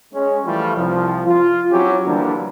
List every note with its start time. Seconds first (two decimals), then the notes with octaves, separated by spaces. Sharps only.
0.14 G#3 C#4
0.45 E3 F3 G3 A3 F4
0.76 C2 F3
1.26 F4
1.71 F#3 C4 C#4 E4 G4
2.06 D3 E3 F3 G3 A#3 D4